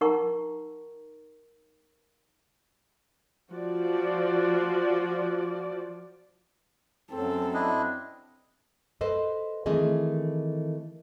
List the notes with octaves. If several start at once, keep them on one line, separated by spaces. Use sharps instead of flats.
D#4 A#4 F#5 A#5 C#6
F3 F#4 D5
F#2 C4 A4
D4 E4 D#5
A4 B4 C5 D#5
D#3 E3 A3 C4 G#4 D#5